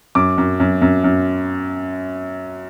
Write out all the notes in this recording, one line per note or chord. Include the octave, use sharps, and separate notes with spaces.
F#2 D6
F#2
F#2
F#2
F#2